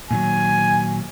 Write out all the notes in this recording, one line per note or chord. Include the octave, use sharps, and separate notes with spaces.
A#2 D#3 F#3 G#5